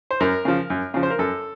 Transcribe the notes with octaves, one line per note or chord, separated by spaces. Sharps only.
C5
F#2 A#4
C#3 F3
F#2
C#3 F3
C5
A#4
F#2 A4